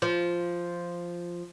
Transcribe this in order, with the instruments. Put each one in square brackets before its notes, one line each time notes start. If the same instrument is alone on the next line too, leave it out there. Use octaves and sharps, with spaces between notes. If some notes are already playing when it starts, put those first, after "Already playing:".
[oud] F3